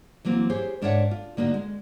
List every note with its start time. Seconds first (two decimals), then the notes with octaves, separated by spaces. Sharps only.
0.25 E3 F#3 A#3 C4
0.50 G4 G#4 C5 C#5
0.82 G#2 D4 A#4 C#5 E5 F#5
1.11 F4
1.37 D3 A#3 D#4 F#4
1.54 G#3